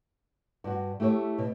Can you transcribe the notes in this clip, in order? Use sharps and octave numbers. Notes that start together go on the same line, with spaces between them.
G2 F#4
A3 E4 G4 A#4 C#5
B2